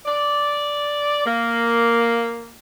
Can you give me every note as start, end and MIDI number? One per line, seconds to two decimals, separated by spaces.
0.06 1.22 74
1.26 2.53 58